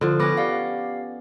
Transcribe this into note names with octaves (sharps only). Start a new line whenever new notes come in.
D3 F3
B3 C#4 D6 F#6 A#6
G4 D5 F5